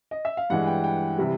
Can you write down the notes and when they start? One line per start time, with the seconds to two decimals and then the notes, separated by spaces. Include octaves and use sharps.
0.11 D#5
0.25 E5
0.37 F5
0.50 G2 E3 G#3 F#5
0.67 G5
0.84 G5
1.18 C3 E3 G3